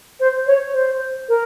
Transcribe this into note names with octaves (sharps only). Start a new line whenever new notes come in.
C5
C#5
C5
A#4